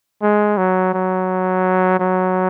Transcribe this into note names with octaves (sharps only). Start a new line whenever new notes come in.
G#3
F#3
F#3
F#3